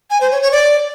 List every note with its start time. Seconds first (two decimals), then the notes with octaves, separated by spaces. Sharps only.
0.10 G#5
0.21 C5
0.31 C#5
0.42 C#5
0.52 D5